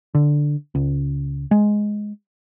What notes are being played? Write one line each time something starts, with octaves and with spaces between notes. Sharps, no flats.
D3
C#2
G#3